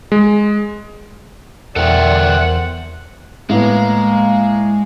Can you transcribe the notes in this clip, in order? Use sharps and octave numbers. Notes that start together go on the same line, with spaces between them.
G#3
E2 A4 A#4 C5 D5 E5 F#5 G5
A2 G#3 A#3 B3